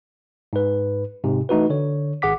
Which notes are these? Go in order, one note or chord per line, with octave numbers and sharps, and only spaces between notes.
G#2 B4
G#2 C3
E3 A3 D#4 F#4 B4
D3 C#5
G#1 G#4 F#5 D6 B6